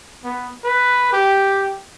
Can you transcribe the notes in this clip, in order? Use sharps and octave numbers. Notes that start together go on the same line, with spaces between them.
B3
B4
G4